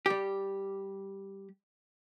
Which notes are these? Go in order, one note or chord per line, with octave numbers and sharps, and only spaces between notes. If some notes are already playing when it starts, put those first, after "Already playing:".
G3 G4